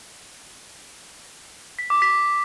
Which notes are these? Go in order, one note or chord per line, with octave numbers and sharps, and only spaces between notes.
B6
D6
B6